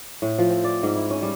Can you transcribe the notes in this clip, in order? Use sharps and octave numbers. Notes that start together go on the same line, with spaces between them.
A2
F3
C4
D5
G#2
E4
C#4
G3